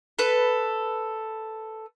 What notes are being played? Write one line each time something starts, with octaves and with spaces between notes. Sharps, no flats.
A4 B4